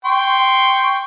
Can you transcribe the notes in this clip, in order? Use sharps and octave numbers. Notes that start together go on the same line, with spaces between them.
G5 C6 C#6